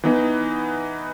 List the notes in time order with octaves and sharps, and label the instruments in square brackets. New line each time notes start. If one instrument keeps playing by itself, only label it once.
[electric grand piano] E3 B3 D#4